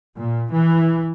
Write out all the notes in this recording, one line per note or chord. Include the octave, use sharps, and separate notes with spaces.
A#2
E3